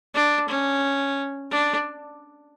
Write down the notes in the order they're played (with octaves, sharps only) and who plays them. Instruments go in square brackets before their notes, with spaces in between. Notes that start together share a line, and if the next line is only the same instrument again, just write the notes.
[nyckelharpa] D4
C#4
D4